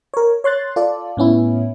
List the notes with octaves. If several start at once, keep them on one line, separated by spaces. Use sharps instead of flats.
A#4 C#5
C#5 C6 F#6 A6
F4 A4 D5
A2 B3 C#4 E4